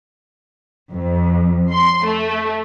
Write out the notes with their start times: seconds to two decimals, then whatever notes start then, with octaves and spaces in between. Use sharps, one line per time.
0.90 F2
1.72 C6
2.05 A3